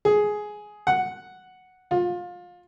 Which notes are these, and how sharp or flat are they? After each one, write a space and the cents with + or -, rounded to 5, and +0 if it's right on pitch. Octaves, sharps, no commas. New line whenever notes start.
G#4 +10
F#5 +0
F4 +25